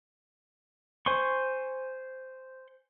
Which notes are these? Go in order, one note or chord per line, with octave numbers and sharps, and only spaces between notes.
C5 G#5 C6 C#6